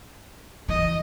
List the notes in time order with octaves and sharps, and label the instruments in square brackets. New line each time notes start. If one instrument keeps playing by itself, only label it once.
[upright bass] E3 [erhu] D#5